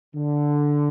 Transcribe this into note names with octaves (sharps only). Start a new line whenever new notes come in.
D3